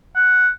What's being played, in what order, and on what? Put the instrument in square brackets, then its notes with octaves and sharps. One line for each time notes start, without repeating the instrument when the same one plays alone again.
[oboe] F#5